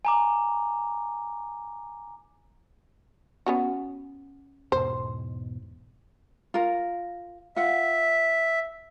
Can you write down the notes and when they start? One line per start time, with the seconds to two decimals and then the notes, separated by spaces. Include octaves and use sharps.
0.05 G#5 A#5 D6
3.46 B3 C#4 F#4
4.72 E2 G#2 B2 C5
6.54 F4 A#4
7.56 F4 E5 F#5